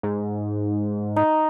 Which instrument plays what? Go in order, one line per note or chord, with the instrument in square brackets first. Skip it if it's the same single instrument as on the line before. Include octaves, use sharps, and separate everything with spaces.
[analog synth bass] G#2
[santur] D#4